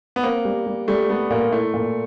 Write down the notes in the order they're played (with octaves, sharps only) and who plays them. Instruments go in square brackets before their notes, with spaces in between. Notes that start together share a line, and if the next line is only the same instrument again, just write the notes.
[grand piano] B3
[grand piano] A#3 [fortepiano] C4
[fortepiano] G3
G3
[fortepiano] G3 [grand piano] A3
[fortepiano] G3 [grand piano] A3 B3
[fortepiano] A#2 [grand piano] A#3
[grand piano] A#3
[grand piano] A3 [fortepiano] E4
[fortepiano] A#2